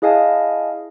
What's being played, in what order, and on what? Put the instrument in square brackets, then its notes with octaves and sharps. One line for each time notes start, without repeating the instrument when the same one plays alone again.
[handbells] E4 G#4 D#5 F5 G#5 A5